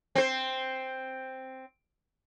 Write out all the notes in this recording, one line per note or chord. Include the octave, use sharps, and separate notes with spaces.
C4 C5